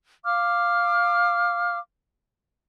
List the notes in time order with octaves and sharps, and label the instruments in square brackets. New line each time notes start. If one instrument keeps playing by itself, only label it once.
[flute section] F5 D6 F6